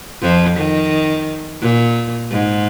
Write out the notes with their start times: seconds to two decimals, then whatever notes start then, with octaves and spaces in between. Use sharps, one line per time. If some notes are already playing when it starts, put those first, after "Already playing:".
0.22 F2 F3
0.57 D#3
1.62 A#2
2.31 G#2